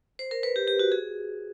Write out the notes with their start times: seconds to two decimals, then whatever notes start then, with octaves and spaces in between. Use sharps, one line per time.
0.19 C5
0.31 A#4
0.43 B4
0.56 G4
0.68 G4
0.79 F#4
0.92 G#4